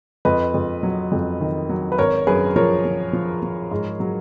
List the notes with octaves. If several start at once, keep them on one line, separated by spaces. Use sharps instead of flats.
F2 B4 D#5
F2
F#3
F2
D#3
F#3
B4
G#1 A#4 C#5
F#2 G#4 B4
F3 A#4 C#5
F3
F3
F3
G#2
F#3